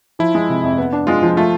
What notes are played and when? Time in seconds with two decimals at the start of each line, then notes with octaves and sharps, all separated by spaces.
0.19 F3 E4
0.35 G#3
0.49 C3
0.64 F2
0.78 B3
0.93 D4
1.07 G#3 F4
1.23 F3
1.37 A3 F4